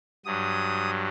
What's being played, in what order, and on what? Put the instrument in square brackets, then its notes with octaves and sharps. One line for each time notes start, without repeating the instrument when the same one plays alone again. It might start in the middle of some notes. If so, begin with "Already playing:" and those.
[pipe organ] G2 F#3 D#6